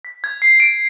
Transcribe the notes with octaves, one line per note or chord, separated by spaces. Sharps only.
B6
G#6
C7
D7